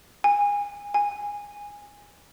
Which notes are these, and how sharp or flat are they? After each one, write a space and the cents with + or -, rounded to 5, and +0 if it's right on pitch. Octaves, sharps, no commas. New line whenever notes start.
G#5 -25
G#5 -15